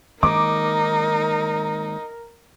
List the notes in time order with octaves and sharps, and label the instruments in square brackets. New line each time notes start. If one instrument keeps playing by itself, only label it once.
[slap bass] D#3 G#3 A#3 [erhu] D#4 [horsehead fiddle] A#4 [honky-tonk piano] D6